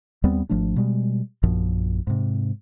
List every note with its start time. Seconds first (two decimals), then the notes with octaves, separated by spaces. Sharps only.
0.24 D#2 G3 B3 C4
0.49 G#1 F3 A3 D4
0.76 B2 G3 G#3
1.43 A#1 F#2 A#2 F3
2.07 G#2 C3